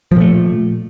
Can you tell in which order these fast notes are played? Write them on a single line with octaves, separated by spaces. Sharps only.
F3 A#2 A3